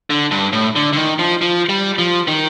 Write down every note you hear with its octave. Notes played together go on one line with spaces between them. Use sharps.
D3
G2
A2
D3
D3
D#3
F3
F3
G3
F3
D#3